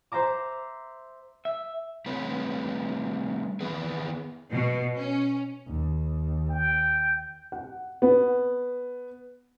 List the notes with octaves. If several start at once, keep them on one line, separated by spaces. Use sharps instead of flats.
C5 E5 A#5 D6
E5
G3 A3 C4 B4 C#5
D#3 B3 G#4 B4
B2
C#4
D#2
G5
F#5
B3